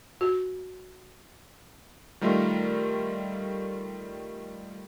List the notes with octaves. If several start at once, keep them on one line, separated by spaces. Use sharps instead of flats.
F#4
D#3 G3 A3 F4 A#4